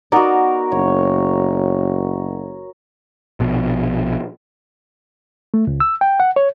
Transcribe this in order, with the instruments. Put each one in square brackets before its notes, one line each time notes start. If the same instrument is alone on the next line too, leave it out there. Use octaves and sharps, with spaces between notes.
[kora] B3 D#4 D5 [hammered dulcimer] F#4 A#4
[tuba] F#1 [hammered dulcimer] C#5
[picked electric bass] A#1 B2
[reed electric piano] A3
C#2
E6
G5
F#5
C#5